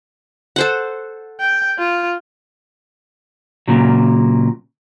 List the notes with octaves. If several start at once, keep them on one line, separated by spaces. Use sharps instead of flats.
A4 C5 F#5
G5
F4
A#2 C#3 F#3